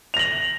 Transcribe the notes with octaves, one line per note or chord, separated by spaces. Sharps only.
A#6 F7 F#7